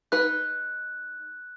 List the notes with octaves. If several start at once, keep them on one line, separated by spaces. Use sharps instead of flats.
D#4 B4 F#6